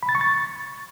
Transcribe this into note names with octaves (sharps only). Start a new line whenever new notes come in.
B5
A6
C#6
A6